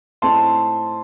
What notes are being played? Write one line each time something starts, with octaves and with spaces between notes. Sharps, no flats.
A2 A3 C4 D#4 A5 C6